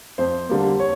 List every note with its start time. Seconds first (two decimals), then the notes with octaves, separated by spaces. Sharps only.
0.18 F2 C5
0.49 D3 G3 A#3
0.80 C#5